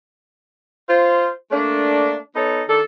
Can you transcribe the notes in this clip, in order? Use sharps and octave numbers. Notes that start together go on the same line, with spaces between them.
F4 C5
A3 A#3 D4
B3 D#4 A4 C#5
D#3 D4 A4